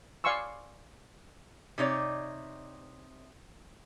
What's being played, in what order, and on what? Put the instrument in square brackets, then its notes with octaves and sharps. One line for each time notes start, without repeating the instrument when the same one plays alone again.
[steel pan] D5 F5 G#5 C6 C#6 E6
[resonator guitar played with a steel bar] C3 D#4 C#5 D5